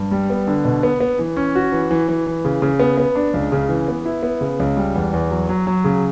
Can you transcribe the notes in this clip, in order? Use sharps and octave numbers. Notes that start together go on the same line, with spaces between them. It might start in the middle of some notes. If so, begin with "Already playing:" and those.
Already playing: G2
G3
B3
D3
B2
B3
B3
E3
C#4
F#4
E3
E3
E3
E3
C#3
C#3
B3
B3
D4
C#2
C#3
E3
B3
E4
B3
C#3
C#2
G3
E2
E2
F#3
F#3
F#3
C#3